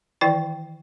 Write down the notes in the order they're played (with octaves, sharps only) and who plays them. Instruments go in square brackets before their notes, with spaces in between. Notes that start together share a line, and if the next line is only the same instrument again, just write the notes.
[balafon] D#3 E3 E4 D5 G5